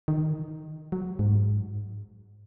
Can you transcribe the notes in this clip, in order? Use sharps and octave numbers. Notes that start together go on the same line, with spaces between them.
D#3
F#3
G#2